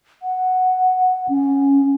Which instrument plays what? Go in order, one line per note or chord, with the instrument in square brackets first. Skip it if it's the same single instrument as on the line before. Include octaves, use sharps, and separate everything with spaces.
[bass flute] F#5
C#4